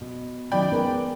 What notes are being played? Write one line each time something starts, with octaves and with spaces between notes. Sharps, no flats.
B2
D#3 F#3 C#4 D5 G5 B5
G#3 B3 A#4